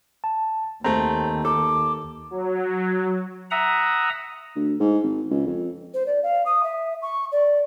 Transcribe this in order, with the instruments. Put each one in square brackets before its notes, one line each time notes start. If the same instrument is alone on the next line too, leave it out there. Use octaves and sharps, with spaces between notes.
[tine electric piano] A5
[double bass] D#2 [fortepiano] A3 C4 [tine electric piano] A#5
[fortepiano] A4 [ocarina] D6
[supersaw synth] F#3
[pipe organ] E5 F#5 A#5 D#6
[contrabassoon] D2
G#2
G#1
C#2
F2
[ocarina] C5
D5
F5
D#6
E5
C#6
D5